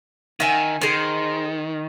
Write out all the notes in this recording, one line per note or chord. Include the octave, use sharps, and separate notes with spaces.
D#3 E5 G#5
D#3 G#4 C5